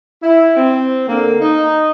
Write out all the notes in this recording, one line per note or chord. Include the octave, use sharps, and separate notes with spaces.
E4
C4
D3 A#3
D#4